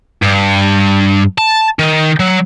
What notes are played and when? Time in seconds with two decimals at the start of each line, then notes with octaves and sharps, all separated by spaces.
0.22 G2
1.38 A5
1.79 D#3
2.20 F#3